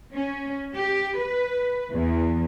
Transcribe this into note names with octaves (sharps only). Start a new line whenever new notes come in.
C#4
G4
B4
E2